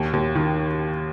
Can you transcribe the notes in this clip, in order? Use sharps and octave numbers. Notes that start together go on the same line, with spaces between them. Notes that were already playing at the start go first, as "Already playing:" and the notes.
Already playing: D#2
D#2
D#3